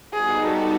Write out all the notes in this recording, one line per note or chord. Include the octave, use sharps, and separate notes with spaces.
G3 B3 D#4 F#4 G#4
A4